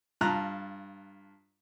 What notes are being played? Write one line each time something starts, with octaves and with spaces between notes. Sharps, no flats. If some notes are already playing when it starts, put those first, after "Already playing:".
G2 F4 A5 A#5 F#6